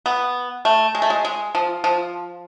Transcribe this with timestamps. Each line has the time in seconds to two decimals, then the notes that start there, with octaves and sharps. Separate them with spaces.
0.06 B3
0.65 A3
0.95 G#3
1.02 A3
1.10 G#3
1.25 G#3
1.55 F3
1.84 F3